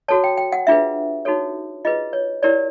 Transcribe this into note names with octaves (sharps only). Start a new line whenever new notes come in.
F#4 A4 C#5 A5
G5
G5
F#5
D4 F4 G#4 B4 E5
D#4 F#4 A4 C#5
F4 G#4 B4 D#5
C#5
E4 G4 A#4 C#5 D5